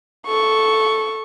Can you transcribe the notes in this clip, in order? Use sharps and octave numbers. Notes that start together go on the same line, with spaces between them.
A4 C#6